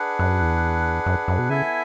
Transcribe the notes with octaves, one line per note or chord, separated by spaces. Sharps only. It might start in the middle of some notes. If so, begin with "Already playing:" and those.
Already playing: D4 G#4 B4 F#5
F#2
E2
F#2
F#2
B2
C#3 B3 E4 A4 E5 G#5